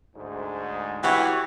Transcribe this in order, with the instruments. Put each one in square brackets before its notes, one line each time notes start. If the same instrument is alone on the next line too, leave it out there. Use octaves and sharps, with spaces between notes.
[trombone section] D2 G#2
[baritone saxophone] E3 [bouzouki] F#4 C#5 [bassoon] G4